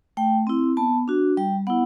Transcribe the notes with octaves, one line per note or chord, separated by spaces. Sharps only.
A3 G5
C4 E4
B3 A5
D4 F#4
G3 G5
B3 E4 F#5